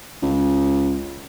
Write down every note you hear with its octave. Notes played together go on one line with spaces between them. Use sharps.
C#2